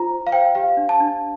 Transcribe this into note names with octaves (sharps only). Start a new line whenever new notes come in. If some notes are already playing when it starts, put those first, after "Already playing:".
Already playing: F4 C5 A#5
C5
F5
C5 G5
G4 F5
D4
A5
D4